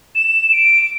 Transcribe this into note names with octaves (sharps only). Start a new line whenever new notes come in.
E7
D7